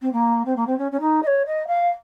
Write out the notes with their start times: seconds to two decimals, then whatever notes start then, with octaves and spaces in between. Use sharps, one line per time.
0.01 C4
0.12 A#3
0.45 C4
0.56 A#3
0.66 C4
0.78 C#4
0.91 C#4
1.00 D#4
1.22 D#5
1.27 C#5
1.46 D#5
1.67 F5